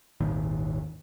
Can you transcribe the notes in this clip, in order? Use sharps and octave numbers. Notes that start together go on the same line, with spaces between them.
G#1 D#2 A#2 D#3